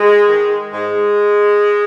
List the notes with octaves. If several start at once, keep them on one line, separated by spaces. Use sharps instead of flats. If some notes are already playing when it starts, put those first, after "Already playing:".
Already playing: G#3
D#3
G#2 G#3